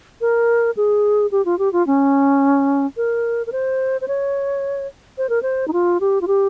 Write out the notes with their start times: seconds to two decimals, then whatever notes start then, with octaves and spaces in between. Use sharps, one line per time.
0.21 A#4
0.77 G#4
1.32 G4
1.45 F4
1.59 G4
1.73 F4
1.87 C#4
2.97 A#4
3.47 A#4
3.52 C5
4.01 C5
4.08 C#5
5.18 C5
5.29 A#4
5.42 C5
5.68 D#4
5.73 F4
6.01 G4
6.21 F4
6.27 G4